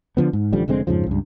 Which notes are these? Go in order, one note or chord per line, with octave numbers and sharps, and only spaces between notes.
D3 F3 B3
G#2
A1 D3 F3 G3
F1 D3 G#3 C4
F2 G#2 C#3 F3
C#2 G2